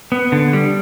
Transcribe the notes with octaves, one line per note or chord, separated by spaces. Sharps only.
B3
D3
G3